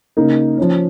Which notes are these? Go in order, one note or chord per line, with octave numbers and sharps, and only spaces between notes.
C#3 A#3 D#4
F3 C#4